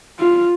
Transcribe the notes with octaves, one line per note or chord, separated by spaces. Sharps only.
F4